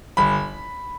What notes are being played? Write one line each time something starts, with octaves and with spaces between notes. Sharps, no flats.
G1 B5